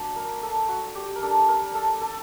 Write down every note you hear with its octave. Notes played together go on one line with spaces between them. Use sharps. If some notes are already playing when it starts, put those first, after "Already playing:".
Already playing: F#3 A#3 D4
A#4
A4
F#4
G4
A#4
G3 D4 A4
A#4
A4
A4